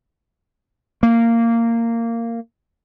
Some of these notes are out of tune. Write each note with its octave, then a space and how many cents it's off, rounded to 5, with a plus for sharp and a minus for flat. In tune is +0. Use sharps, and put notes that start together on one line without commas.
A#3 -15